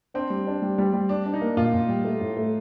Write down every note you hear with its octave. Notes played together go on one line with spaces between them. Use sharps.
C4 D4
G3
D4
G3
G3
G3
G3 D4
D4
D#4
A#3
A#2 F4
A#2
G3
A3
A2
A3